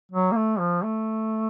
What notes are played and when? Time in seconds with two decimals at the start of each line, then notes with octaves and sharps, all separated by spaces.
0.11 F#3
0.32 A#3
0.36 A3
0.59 F3
0.84 A3